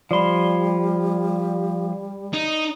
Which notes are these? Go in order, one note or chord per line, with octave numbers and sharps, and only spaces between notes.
F3 G3 D5 B5 C6
D#4